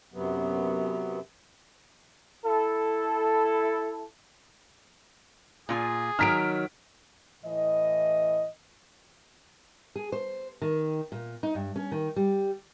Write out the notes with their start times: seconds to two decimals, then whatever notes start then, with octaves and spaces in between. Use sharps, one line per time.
0.14 F#2 C3 F#3 B3
2.45 E4 A4
5.69 A#2 F4 G#4 G#5
6.19 D#3 E3 F#3 A#5 F6 B6 D7
7.43 A2 E3 D#5
9.96 G#4
10.12 C5
10.62 D#3
11.12 A#2
11.43 D#4
11.55 G2
11.76 C#4
11.92 D#3
12.16 G3